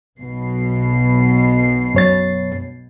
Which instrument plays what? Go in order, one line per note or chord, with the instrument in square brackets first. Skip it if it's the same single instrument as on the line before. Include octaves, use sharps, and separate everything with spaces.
[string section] B1 B2 C7
[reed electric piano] F#2 C#5 A6